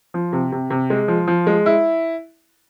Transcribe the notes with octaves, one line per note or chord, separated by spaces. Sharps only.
F3
C3
C3
C3
G#3
F3
F3
G#3
E4